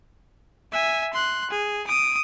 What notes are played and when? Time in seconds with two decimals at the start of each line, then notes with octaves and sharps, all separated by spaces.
0.72 E5 G#5
1.13 C6 F#6
1.50 G#4
1.87 D#6 D7